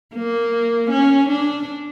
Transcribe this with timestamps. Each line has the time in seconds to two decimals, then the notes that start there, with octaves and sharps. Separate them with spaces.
0.15 A#3
0.90 C#4
1.29 D4